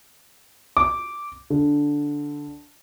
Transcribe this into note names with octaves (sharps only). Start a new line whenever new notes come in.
D6
D3